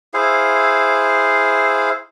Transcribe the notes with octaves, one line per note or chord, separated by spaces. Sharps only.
E4 G#4 C5 F5